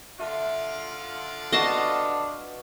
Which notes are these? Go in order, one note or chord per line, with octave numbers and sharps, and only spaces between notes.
D3 F4 E5
B3 D4 F#4 D#5 F5 A5